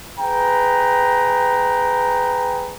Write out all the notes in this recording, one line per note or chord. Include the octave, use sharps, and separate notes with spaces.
G#4 B4 G5 A#5